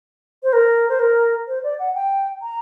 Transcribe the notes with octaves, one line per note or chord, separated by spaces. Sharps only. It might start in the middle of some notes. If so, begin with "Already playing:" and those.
C5
A#4
C5
A#4
C5
D5
F#5
G5
A#5